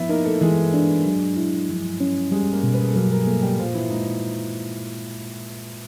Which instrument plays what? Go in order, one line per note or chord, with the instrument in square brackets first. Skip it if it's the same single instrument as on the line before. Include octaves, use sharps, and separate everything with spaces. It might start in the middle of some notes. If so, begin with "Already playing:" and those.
Already playing: [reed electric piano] F3 [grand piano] B3 E4 B4 E5
[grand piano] A#3 A#4 [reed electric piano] D#4
[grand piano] A3 A4
[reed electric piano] E3 [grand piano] G#3 G#4
[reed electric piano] D4
F#3
E4
F3
C#4
[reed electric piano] G3 [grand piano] G#3 G#4
[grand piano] A#3 A#4
[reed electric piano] B2
[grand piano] B3 B4
G#4
A4
[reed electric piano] F#3 [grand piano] A#3 A#4
[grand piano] A#3 A#4
G#4
[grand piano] A3 A4 [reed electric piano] A#3
[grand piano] G3 G4
[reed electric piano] A#2 [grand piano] F3 F4
[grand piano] E3 E4
[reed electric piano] G#3 [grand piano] D#4
[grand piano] D#4